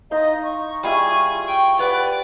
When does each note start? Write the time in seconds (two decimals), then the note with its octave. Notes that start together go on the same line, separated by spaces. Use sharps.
0.11 D#4 D#5 F5 C6
0.44 C#6
0.83 G3 F4 G#4 E5
1.48 G5
1.79 G4 B4 D5 F#5